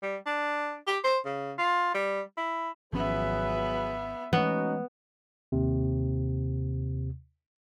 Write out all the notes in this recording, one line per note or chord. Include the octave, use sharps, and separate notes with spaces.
G3
D4
G4
C5
C#3
F4
G3
E4
G#1 F3 F#3 B3 C#4 G#4 B4 E5
E3 G#3 A3 B3 C#4 D#4 F#4
D#2 C3